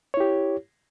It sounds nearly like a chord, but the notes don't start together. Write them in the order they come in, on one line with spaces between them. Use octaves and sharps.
C#5 E4 G4